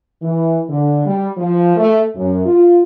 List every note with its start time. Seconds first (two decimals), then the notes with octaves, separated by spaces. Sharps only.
0.22 E3
0.69 D3
1.06 G3
1.37 F3
1.76 A3
2.16 F#2
2.46 F4